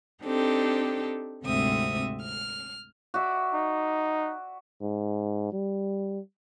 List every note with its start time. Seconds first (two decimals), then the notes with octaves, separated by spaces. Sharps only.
0.23 C4 D4 D#4 G4 A4
1.45 D2 G#2 C3 C4 E5 D#6
2.23 F6
3.14 F#4 D5 E5
3.54 D#4
4.82 G#2
5.52 G3